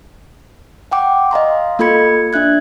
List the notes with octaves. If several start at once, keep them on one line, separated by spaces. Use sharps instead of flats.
F#5 G5 D6
D#5 F5 A#5 C6
A#3 F4 A4 B5 G#6 C#7
D4 E5 F#6 G#6